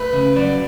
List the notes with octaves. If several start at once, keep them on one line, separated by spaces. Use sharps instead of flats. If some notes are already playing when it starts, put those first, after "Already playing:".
Already playing: A3 B4
C#3
F#3 D5